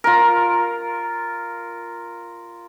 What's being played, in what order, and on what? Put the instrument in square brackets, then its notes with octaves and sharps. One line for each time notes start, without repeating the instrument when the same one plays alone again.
[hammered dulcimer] F4 A#4